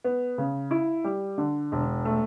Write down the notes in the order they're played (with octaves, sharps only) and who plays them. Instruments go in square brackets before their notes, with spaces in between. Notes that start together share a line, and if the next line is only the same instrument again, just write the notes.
[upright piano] B3
C#3
E4
G3
D3
E1
A3